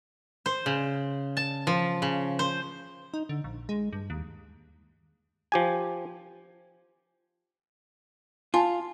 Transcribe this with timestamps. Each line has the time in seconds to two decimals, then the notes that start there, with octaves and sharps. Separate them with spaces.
0.46 C5
0.66 C#3
1.37 A5
1.67 F3
2.02 C#3
2.39 C5
3.14 D#4
3.29 D3
3.44 A#1
3.69 G#3
3.93 G2
4.10 D#2
5.52 F3 G4 G#5
8.54 F4 G#5 A5 C6